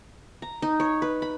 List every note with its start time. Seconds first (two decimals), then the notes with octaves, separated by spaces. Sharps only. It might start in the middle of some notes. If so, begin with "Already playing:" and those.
0.42 A#5
0.62 D#4
0.80 C#5
1.02 B4
1.22 B5